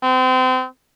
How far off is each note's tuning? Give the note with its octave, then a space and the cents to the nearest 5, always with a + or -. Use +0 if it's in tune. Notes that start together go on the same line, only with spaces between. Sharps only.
C4 -30